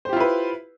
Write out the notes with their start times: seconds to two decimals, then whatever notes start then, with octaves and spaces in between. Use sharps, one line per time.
0.05 C5
0.09 G4
0.13 F4
0.17 E4
0.20 B4